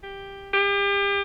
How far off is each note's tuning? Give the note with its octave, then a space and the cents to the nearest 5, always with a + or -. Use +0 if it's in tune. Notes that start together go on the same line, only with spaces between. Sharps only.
G4 +10
G4 +35